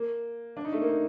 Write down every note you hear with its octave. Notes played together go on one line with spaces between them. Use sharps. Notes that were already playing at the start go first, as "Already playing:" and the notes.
Already playing: A#3
D4
D#4
A3
A#3
D#4